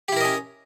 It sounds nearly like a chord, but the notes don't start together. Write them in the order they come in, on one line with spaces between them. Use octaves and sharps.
G4 E4 A#4 D#5 C#4